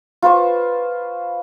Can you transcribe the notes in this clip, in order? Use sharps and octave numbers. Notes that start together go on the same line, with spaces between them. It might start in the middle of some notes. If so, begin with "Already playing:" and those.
F4 B4 C5 C#6